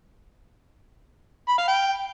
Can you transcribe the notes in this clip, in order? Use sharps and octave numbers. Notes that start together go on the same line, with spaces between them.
B5
F5
G5